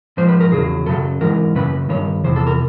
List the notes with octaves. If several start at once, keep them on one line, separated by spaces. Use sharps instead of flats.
G#2 F3 C5
B4
A#4
E2 C#3 F#3 G#4
F#2 C#3 F#3 A4
G#2 E3 A#4
F#2 C#3 B4
G2 D#3 C#5
E2 C3 C5
A4
A#4